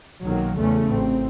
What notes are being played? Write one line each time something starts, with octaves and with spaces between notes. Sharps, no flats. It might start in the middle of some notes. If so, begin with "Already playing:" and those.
B1 D#3 F#3 A#3
E2 C#3 A3 C#4
A1 C4